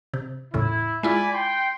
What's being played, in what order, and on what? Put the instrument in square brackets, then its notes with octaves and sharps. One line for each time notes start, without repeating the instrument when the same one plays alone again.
[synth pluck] C3
[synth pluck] E2 A2 C#3 [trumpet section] E4
[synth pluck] G#3 E4 F4 [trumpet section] D5 G#5 B5
[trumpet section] G5 C6